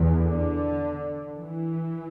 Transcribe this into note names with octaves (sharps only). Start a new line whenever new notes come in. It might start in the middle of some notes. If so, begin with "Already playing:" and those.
Already playing: E2
D3
E3